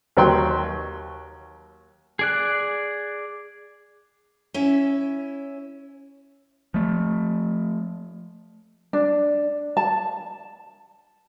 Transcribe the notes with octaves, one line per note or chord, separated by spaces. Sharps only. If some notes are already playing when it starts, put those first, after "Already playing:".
D#2 F#3 G5 C6
G#4 D5 F#6
C#4 E4 E5
F3 A3
D4
A5